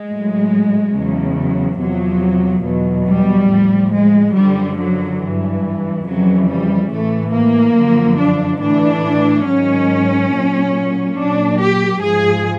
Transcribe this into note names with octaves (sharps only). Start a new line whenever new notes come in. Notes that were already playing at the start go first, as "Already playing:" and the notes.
Already playing: G#3
A2 F#3
E2 C#3 F#3
F#3
E2 C3 F3 F#3
E2 B2 F#3
G3
A2 F3
G#3
F#2 D3 F3 G3
F#3
G2 E3
F2 C#3 E3 F#3
G3
A2 E3 A3
A#3
F#2 D3 F3
D4
A2 E3 D4
G#2 D#3 F#3 C#4
A#2 F#3
A#2 F#3 D4
G4
G#2 F3 G#4